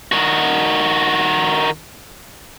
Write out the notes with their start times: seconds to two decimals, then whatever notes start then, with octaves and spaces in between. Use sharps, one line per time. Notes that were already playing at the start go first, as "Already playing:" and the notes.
0.12 D#3 F#4